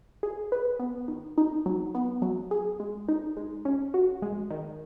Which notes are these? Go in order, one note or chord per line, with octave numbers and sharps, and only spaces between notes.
G#4
B4
B3
D#3
D#4
F#3
B3
F#3
G#4
G#3
D#4
G#3
C#4
F#4
G#3
D#3